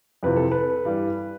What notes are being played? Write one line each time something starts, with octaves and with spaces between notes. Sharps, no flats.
F2 C3 E3 B4
A4
B4
G2 E3 G3